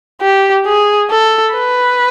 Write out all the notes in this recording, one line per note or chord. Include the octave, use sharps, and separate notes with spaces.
G4
G#4
A4
B4